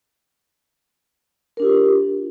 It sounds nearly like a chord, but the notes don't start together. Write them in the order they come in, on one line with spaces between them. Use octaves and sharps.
A#4 D4 G4 F4